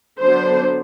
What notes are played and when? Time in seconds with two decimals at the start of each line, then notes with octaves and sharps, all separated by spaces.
0.20 D3 F#3 B3 D4 C5